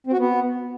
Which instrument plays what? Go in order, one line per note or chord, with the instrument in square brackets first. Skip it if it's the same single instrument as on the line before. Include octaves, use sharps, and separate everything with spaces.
[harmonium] C4
F#4
B3